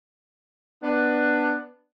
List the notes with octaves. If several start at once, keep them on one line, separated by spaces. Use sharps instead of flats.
B3 D4